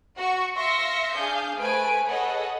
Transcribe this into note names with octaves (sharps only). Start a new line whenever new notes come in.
F#4 C#6
E5 F5 C6 E6 A#6 C#7
D4 G#4 F5 D#6 G6
A3 B4 C5 G#5 D7
G#4 A4 B4 C#5 D#5 F#5